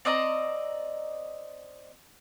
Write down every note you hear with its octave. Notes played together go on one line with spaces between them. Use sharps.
C4 D5 D#5 A#5